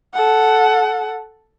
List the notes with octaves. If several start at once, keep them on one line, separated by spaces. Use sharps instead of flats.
A4 F#5